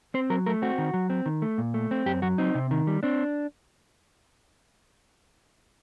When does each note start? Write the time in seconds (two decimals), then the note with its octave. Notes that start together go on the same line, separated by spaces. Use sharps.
0.14 C4 C5
0.30 F#3 A#4
0.46 A3 A#4
0.62 C4 F#4
0.78 D#3
0.94 F#3
1.10 C4
1.26 D#3
1.42 A3
1.58 A#2
1.74 A3
1.91 C4
2.06 F#2 G4
2.22 F#3 F#4
2.38 C4 D#4
2.55 C3
2.71 D#3
2.87 G3
3.03 C4 D4